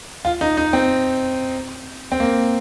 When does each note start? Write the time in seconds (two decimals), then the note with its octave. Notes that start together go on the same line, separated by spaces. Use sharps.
0.25 F4
0.41 D#4
0.57 D#4
0.73 C4
2.12 C4
2.20 A#3